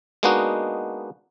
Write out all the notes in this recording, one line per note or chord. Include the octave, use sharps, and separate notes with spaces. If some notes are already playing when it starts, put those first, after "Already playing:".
G#3 A#3 B3 D4 D#4 F#4